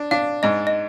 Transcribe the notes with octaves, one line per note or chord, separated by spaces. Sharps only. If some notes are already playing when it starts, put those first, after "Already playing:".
Already playing: D4
D4 F5
G#2 D#5
D#5